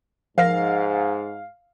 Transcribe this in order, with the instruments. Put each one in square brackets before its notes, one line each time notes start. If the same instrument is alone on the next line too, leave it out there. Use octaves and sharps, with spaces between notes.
[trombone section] G#2 [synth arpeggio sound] F3 A#4 A#6 [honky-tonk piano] F5